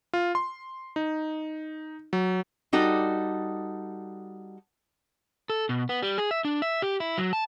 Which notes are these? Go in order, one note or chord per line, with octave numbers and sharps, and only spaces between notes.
F4
C6
D#4
F#3
G3 D#4 F#4 A4
A4
B2
B3
G3
G#4
E5
D4
E5
G4
E4
F#3
A5